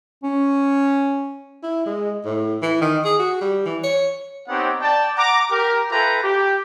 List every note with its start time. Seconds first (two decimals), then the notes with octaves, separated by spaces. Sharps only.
0.24 C#4
1.63 E4
1.86 G#3
2.25 A2
2.62 E3
2.81 D#3
3.04 G#4
3.19 F#4
3.41 G3
3.66 E3
3.83 C#5
4.48 B3 C4 D#4 G4 C#5 F#5
4.81 D5 G5 A5
5.17 F#5 A#5 D6
5.51 G4 A#4
5.91 F4 A4 B4 E5 G5 A#5
6.23 G4